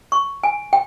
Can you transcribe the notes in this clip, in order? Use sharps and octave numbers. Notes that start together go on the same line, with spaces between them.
C#6
G#5
G5